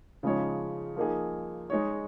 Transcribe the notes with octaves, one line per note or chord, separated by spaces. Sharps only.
C#3 F3 G#3 D#4 C#5
F3 A#3 D#4 G#4
G#3 D#4 C#5